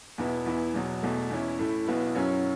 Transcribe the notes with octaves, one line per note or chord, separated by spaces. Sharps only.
E2 B2 B3 E4
E2 E3 B3 E4
E2 B2 F#3
E2 B2 A3
E2 E3 C#4 E4
A2 A3 E4
B1 B2 B3 E4
F#2 F#3 C#4 E4